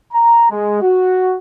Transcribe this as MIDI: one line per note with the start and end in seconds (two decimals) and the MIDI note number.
0.12 0.47 82
0.50 0.80 56
0.81 1.37 66